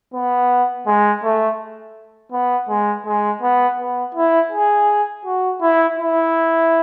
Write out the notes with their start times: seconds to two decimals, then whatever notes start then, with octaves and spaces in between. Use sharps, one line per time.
0.14 B3
0.86 G#3
1.23 A3
2.32 B3
2.69 G#3
3.06 G#3
3.42 B3
3.78 B3
4.14 E4
4.52 G#4
5.25 F#4
5.61 E4
5.98 E4